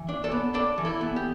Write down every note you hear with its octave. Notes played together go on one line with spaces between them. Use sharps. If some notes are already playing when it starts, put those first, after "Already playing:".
Already playing: E3
D4
A4 D5
B3
D4 A4 D5
E3
E4 A4
B3
G4